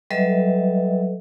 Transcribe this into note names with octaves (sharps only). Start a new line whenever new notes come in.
F#3 G3 A4 B4 D#5 E5